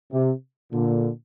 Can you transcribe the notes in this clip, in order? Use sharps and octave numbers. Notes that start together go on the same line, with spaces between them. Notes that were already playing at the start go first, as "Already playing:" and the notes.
C3
A#2 D3